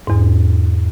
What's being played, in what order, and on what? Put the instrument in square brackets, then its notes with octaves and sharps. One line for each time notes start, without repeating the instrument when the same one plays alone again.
[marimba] E2 G#2